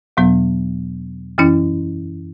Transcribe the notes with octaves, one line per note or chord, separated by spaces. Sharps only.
E2 B2 F#3 B3
F#2 E3 C#4 E4